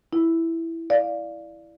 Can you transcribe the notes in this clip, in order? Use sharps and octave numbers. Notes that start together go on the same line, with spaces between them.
E4
D5 F5